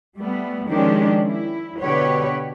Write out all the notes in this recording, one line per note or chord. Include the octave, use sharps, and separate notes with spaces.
G3 A3 B3
D#3 F3 G#3 C#4 D4 G4
E4
B2 D3 G4 B4 C#5